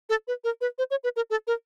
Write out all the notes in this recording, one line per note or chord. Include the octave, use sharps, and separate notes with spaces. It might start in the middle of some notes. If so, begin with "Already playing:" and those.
A4
B4
A#4
B4
C5
C#5
B4
A#4
A4
A#4